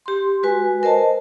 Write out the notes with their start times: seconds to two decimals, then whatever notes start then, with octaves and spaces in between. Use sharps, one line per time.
0.06 G4 C6
0.43 G#3 F#4 B4 G#5
0.83 A#4 C5 D#5 A5